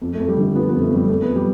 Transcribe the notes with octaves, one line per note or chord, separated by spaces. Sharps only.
F2
A3
F2
G3
D3 A3
F3 B3
B3
F2
A3
F2 G3
F2 A3
B3
F2
G3